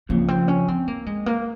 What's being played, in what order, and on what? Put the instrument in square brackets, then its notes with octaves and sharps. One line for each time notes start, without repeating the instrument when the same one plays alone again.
[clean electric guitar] F2 C#3 F3 [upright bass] A#3
[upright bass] C4
C#4
C4
A#3
G#3
A#3